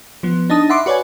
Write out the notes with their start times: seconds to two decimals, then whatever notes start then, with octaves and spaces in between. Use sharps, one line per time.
0.23 F3 B3
0.50 D4 D#4 A5 D#6
0.69 E5 F#5 B5 C6 D6
0.86 F#4 B4 C#5 D5 F#5 G#5